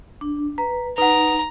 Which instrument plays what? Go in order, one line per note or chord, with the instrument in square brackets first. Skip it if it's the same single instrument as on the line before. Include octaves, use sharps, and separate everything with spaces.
[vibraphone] D4
[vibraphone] B4 [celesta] A#5
[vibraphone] D#4 [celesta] B4 F#5 [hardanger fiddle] A#5